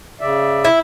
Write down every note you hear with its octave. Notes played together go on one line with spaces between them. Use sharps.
C#3 D5 E5
E4